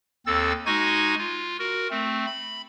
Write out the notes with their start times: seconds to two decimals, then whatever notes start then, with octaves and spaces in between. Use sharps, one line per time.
0.26 D#2 C4 A4 E6 A6
0.66 G#3 D#4 F#4 G#5 C#6 G#6
1.18 F4
1.59 F#4 A#4
1.91 A3 C4
2.26 B5